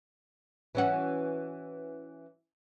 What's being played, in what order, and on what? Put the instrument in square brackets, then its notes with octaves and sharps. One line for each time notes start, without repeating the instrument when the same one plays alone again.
[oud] E3 C#4 F#4